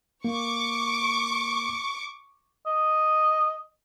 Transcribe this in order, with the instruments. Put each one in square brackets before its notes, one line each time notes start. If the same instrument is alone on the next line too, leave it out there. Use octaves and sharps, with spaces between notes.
[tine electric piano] A#3 [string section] C#6 D6
[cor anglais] D#5